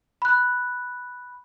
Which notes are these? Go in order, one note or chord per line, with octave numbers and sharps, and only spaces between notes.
B5 F#6